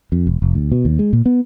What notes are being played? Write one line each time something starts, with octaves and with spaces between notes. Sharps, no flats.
F2
E1
F1
D2
B2
D#2
G#3
A#2
B3